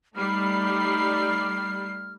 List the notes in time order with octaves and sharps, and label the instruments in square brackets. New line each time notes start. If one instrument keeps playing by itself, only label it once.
[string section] G3 C7 [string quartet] A3 D#4 B5 [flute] F6